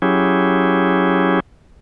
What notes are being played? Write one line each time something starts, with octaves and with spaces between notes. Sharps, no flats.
F#3 C#4 E4 G4 G#4